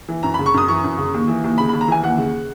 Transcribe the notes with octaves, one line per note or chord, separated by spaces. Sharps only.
E3
F#2 A#5
B5
C#3
C#6
F#2 D#6
E3 C#6
F#2
C#3
D#2
E3
D#2
C#3 B5
B5
D#2
A#5
E3 G#5
D#2 F#5
C#3